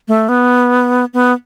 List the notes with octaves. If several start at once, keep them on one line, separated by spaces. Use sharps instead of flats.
A3
B3
B3